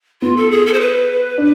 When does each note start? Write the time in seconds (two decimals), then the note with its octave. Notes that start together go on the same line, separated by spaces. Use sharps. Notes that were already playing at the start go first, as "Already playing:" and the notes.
0.22 B3 F4
0.36 A4
0.51 G#4
0.66 A4
0.73 C5
0.80 B4
1.38 D4